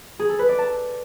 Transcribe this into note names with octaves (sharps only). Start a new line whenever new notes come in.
G#4
A4
B4
D5
A5